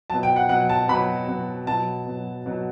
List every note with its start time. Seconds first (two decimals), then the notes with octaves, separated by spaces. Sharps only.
0.10 B2 F#3 A5
0.23 G5
0.36 F#5
0.49 B2 F#3 F#5
0.69 A5
0.88 B2 F#3 B5
1.28 B2 F#3
1.67 B2 F#3 A5
2.06 B2 F#3
2.46 B2 F#3